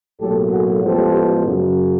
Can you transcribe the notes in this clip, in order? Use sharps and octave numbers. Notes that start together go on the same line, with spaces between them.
B1 A2 F#3 A#3 G4 A4
F#4 G#4
A1 A2 F3 G#3 B3 G4 A4
F#2 C#3 F#3